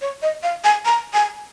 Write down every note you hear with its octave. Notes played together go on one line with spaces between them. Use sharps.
C#5
D#5
F5
G#5
A#5
G#5